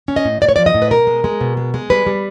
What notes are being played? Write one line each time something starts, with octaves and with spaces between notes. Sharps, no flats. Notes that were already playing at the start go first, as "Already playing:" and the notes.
C#4
D#5
A2
A2 D5
C#5
F3 D5
D#5
A2
B4
B2 A#4
G#3
G#3
B2
G#3
G#3
G3 B4
G3